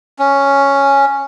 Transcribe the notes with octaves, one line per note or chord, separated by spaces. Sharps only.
C#4